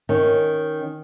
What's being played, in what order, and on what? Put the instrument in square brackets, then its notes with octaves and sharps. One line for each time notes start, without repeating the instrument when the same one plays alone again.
[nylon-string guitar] D#3 C#4